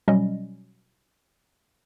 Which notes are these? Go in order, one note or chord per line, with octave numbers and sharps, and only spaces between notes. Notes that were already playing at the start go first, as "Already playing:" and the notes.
B2 F#3 G3 C#4 D#5